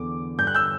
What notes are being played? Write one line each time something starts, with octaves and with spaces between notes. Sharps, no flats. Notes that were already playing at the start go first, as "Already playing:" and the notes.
Already playing: E2 D3 D6
G2 D3 F#6 G6
E6 G6